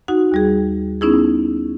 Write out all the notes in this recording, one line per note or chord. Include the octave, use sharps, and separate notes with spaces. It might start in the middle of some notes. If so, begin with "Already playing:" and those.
D#4 F#4 F#5
D#2 G3 G#4
B3 C#4 D#4 E4 G#4